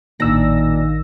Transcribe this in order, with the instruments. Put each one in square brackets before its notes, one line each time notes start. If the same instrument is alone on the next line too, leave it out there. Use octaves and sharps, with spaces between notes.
[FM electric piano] A1 E6 A#6 [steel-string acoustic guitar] A#2 D4 [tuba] D#3